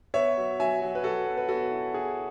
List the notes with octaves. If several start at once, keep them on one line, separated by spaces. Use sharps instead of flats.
B3 C#5 E5
F#3
F#3 E5 G#5
F#3
B4
F#3 F#4 A4
B3
B4
B3 F#4 A4
E4
E4 G#4